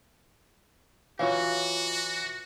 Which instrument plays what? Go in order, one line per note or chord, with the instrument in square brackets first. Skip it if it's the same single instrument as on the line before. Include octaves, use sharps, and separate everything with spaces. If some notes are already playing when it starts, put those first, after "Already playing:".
[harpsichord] E3 F#3 [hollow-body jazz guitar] F4 C#5 F5 [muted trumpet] F#4